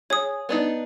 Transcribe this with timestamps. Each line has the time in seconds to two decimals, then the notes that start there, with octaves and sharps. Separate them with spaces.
0.10 G#4 C#5 D#6
0.49 B3 D4 D#4